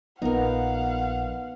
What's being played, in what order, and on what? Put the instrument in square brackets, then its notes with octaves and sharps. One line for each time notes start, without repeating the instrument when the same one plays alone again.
[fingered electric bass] A#1 F3 [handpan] B3 [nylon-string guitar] D#4 A#4 [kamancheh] F5 F#5